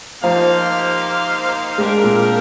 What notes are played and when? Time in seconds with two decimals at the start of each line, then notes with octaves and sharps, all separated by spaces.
0.23 F3 A#3 D#4 G4 C5 F5
1.78 G#3 D4 G4 A#4 F5
2.04 A#2